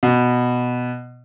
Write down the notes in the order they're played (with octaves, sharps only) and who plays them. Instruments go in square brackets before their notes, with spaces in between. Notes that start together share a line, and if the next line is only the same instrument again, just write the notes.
[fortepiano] B2